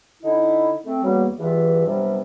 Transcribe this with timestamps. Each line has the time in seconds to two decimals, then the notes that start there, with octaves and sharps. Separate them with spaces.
0.23 D3 D#4 E4
0.85 A3 C4
1.03 E2 F#3 G3 A#3 B3
1.39 E2 G2 E3 F4 E5
1.86 G2 C3 F#3 G3 B3